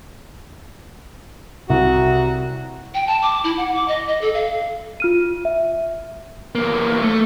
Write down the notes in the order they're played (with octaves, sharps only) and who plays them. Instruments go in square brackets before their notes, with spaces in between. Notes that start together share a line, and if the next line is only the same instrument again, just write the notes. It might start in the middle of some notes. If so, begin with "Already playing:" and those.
[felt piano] C2 [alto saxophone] F#4
[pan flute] G5
A5
D6
E4
F#5
D6
D#5
D#5
A4
F5
[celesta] F4 F6 D#7
E5
[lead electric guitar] E2 A#3
A3